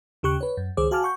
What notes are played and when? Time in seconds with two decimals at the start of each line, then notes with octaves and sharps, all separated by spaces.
0.23 D#2 C#3 G4 C#6 F#6
0.41 B4 C#5
0.57 F#2
0.77 C#2 D#3 G#4 C5 D6
0.91 F#4 F5 G#5 A5 D6 F6
1.03 F#5 C#6 G6